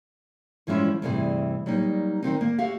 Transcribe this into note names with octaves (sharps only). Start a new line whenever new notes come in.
G2 E3 F3 G#3 C#4 E4
D2 G2 C3 E3 G#4
F#3 G3 A#3 D#4
D#3 F3 C4 D#4
A#3
F#4 G4 E5 F5